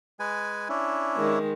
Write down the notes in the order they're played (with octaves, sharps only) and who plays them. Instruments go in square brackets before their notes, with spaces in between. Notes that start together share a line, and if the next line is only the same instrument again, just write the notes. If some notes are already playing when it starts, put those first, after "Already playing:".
[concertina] G#3 B4 G#5
C#4 D4 E4
[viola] D#3 G#3